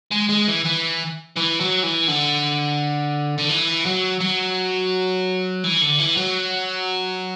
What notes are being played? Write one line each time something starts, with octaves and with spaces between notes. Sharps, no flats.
G#3
G#3
E3
E3
E3
F#3
E3
D3
D3
E3
F#3
F#3
E3
D3
E3
F#3